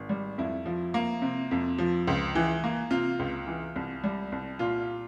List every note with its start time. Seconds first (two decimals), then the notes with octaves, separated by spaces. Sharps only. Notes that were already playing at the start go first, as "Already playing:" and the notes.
Already playing: G#1
0.09 G3
0.38 F2 E4
0.66 F3
0.94 A#3
1.22 C3
1.51 F2
1.78 F3
2.07 C#2
2.35 E3
2.64 A#3
2.91 C3 F4
3.19 C#2
3.47 E3
3.76 C2
4.04 G3
4.32 C2
4.59 A#2 F4